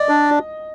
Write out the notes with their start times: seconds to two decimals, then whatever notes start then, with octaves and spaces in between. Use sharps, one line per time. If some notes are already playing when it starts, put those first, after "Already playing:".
Already playing: D5 D#5
0.09 D4